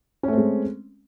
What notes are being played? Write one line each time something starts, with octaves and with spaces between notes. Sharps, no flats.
G#3 A3 C4 C#4